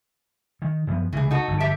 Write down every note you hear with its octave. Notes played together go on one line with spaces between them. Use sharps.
D#3
F#2 F3 B3
C#2 C3 E3 G#4
D#4 F#4 A4
G1 F2
G4 A4 E5